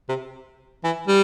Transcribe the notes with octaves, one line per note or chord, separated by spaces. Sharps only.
C3
E3
G3